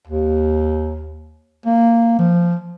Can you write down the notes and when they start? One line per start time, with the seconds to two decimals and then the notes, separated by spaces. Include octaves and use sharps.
0.07 D#2
1.66 A#3
2.19 F3